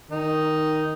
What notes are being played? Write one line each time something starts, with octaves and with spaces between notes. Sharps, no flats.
D#3 D#4